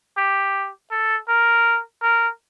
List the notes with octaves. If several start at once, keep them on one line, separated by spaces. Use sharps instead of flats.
G4
A4
A#4
A#4